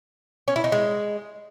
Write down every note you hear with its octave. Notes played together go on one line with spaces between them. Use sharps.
C#4
E4
D#4
G#3